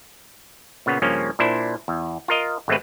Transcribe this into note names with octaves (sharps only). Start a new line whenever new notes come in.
A#2 C#3 B3
G2 C#3 F3 A#3 C#4
A#2 D4 E4 C5
E2
F4 A#4 D#5
G#1 G#3 A3 C4 B4